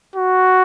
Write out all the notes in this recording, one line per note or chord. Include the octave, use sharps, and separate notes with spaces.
F#4